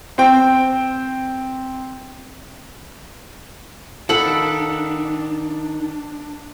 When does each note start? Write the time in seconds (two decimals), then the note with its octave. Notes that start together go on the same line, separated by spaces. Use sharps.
0.18 C4 G5
4.09 D#3 D4 A4 F5 F#5 B5